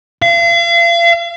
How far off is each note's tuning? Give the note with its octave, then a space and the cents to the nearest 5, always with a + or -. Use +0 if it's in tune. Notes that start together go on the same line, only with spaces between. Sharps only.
F5 -40